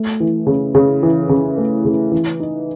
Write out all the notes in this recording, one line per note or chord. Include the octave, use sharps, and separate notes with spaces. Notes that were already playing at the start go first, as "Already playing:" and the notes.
Already playing: A3
E3
C#3
C#3
E3
C#3
A3
C#3
E3
D#4